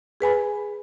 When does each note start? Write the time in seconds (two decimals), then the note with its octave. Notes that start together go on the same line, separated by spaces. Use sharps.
0.21 G#4 B4 G#5 B5